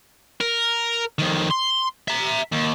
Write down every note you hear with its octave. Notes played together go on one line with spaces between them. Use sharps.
A#4
F2 D#3
C6
E5 A#5
D#2